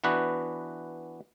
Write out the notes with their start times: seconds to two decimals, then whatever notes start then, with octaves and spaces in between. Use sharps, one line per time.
0.04 E3 B3 D4 F#4 B4